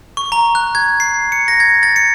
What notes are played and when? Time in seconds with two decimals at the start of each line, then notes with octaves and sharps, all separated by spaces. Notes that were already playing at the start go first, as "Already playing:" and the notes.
0.17 C#6
0.32 A#5
0.55 F#6
0.75 G#6
1.00 C7
1.32 C#7
1.48 A#6
1.60 G#6
1.83 A6
1.96 C#7